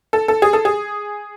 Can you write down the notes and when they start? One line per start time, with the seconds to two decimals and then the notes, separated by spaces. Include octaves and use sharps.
0.13 A4
0.28 A4
0.42 G#4
0.53 A4
0.65 G#4